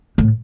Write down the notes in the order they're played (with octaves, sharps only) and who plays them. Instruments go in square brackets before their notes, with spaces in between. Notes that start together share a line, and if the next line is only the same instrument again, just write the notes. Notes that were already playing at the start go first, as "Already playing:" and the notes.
[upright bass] A2